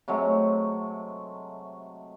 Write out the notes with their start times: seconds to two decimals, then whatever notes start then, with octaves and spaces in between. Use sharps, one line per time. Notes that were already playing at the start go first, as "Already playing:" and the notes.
0.08 C3 F#3 G#3 A3